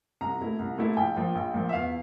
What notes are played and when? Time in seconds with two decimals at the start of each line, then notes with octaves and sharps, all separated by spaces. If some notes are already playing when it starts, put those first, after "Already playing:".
0.21 C2 A#5
0.40 A#2 A3 E4
0.59 C2
0.78 A#2 A3 E4
0.97 A#1 G5
1.16 A#2 F3
1.35 A#1
1.54 A#2 F3
1.69 E5
1.73 E2 F5